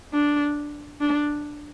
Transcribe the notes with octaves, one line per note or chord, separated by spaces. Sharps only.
D4
D4